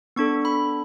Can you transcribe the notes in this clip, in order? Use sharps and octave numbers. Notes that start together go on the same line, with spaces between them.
B3 D4 A4 C#6
B5